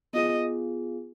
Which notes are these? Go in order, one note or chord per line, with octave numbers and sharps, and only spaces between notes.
B3 F4 G#4 D#5